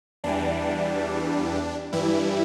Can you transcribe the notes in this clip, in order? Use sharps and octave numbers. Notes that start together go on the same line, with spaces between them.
E2 E3 G3 D4
G2 E3 G3 E4